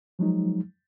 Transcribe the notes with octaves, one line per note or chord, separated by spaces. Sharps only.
F3 F#3 G#3 D#4